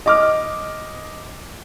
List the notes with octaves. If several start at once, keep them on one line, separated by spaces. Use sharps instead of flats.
D#5 D6 F6